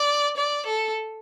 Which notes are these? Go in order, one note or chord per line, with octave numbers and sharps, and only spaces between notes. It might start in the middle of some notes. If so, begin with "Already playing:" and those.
Already playing: D5
D5
A4